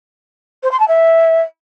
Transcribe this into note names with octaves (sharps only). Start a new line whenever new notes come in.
C5
C6
A5
E5